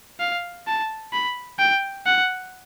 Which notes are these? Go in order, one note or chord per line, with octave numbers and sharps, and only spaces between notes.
F5
A5
B5
G5
F#5